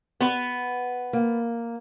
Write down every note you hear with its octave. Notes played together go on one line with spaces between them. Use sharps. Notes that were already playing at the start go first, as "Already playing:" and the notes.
B3 B4
A#3